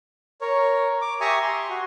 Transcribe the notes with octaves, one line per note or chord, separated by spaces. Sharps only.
A#4 C#5
D6
G4 E5 G#5 A#5 C#6 D#6
C6
F#4